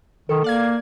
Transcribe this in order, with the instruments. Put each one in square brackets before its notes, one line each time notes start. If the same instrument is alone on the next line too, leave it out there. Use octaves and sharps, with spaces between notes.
[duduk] D#3 [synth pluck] A4
[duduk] A#3 [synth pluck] D5 F5 G#6